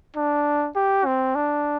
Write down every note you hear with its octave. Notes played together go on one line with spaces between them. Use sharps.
D4
G4
C4
D4